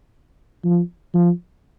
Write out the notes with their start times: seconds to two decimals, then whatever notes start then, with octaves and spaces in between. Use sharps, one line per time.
0.64 F3
1.14 F3